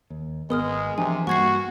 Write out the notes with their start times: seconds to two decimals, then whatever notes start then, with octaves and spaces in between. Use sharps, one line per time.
0.10 D#2
0.50 G#1 G#3 B3 A#4 D#6 F6
0.98 C3 E3 F3 D4 G#5
1.27 G2 G3 A#3 F#4 C#6 G#6 C7